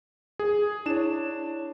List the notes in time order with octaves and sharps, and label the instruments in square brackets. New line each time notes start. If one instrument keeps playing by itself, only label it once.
[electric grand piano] G#4
[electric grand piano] D4 E7 [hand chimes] E4 C#5